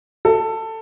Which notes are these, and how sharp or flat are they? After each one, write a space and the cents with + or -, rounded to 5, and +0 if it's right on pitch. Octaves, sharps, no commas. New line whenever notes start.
A4 +15